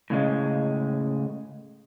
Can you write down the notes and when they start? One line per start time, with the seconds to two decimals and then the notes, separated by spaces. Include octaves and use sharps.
0.10 A2 C#3 G#3